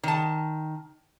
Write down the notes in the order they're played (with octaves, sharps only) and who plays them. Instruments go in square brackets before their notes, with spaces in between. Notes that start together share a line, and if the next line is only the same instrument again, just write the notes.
[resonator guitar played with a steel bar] D#3 A5